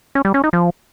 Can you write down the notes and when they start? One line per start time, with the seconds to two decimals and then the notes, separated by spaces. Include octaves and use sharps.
0.15 C#4
0.25 G3
0.34 C#4
0.44 D#4
0.53 F3